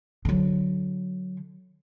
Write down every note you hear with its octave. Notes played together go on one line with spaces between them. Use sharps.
D3 F#3